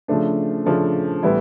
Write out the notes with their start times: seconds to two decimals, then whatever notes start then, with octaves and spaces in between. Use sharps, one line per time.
0.08 C#3 F3 A3 D4
0.65 C#3 F3 A3 D4
1.23 A2 E3 G3 B3 E4